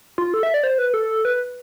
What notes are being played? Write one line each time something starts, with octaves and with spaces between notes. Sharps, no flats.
F4
A4
E5
D5
C5
B4
A4
B4